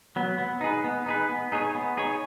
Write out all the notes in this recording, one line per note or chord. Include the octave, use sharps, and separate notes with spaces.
F#3 B3
B3
D#4 G#4 B4
B3
D#4 G#4 B4
B3
D#4 G#4 C#5
B3
D#4 G#4 C#5